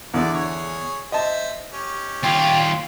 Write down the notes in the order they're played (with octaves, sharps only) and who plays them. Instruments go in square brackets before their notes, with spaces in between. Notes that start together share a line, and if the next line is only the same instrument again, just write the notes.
[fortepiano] E2 D3 [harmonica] D5
[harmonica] G#4 C#5
[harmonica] C5 E5 [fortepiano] D#5 A5
[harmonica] C#4 G4
[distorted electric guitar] D#2 F4 [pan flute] G5